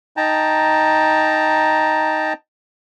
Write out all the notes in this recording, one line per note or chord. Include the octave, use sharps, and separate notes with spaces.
D#4 G5 A5 A#5